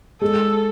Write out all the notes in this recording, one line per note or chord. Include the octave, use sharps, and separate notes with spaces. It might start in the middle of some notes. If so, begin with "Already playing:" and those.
G#3 A4